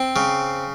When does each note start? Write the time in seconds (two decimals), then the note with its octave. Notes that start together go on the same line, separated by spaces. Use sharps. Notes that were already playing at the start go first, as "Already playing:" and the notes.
Already playing: C4
0.16 C#3